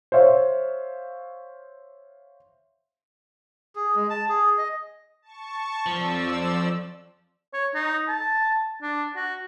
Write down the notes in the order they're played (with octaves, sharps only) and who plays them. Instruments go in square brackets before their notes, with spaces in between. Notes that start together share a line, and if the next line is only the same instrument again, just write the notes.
[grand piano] C5 C#5 E5 F5
[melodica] G#4
G#3
A5
G#4
D#5
[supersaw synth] A5 C#6
[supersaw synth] F2 D5 E6 [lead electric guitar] F3
[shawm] C#5
D#4
A5
D4
F#4